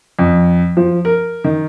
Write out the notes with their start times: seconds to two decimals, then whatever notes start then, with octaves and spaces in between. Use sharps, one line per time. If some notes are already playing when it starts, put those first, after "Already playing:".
0.19 F2
0.77 F3
1.05 A#4
1.44 D#3